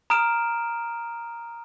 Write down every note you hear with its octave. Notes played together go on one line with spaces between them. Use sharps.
A#5 D#6 F6 D7 E7